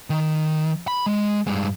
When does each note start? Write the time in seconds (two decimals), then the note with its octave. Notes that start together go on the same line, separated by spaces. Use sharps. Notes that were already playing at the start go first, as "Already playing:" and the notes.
0.10 D#3
0.88 B5
1.06 G#3
1.47 G2 G#3